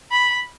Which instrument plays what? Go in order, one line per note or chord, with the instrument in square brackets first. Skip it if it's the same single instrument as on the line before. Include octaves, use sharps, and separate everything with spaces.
[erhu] B5